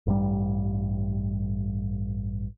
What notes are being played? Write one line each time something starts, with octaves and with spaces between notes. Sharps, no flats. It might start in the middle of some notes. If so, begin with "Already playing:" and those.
A1 G2 G3